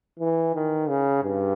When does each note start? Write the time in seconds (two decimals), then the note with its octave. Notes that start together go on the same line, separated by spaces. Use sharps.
0.19 E3
0.55 D#3
0.89 C#3
1.24 G2